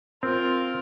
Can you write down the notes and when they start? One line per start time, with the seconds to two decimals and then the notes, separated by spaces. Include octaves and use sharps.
0.23 C4 F4 A#4